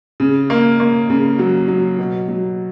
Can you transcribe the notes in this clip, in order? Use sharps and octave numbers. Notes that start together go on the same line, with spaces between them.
C#3
A#3
A#3
C#3
F#3
F#3
B2
F#3